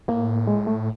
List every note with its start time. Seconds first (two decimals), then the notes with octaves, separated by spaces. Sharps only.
0.08 A2 A#3
0.47 G#3
0.67 A3